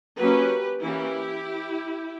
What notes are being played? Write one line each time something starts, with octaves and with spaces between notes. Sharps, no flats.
F#3 A#3 C#4 G4 B4
E3 A#3 C#4 E4 G4